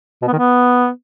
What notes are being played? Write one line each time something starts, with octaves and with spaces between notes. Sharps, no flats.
B2
B3
D#3
B3